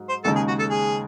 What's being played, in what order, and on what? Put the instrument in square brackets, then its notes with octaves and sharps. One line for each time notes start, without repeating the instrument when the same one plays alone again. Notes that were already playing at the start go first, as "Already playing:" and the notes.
Already playing: [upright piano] G#2 F#3
[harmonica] C5
[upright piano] D#2 C#3 G#3 D#4 [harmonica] A4
[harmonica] G#4
F#4
A4
G#4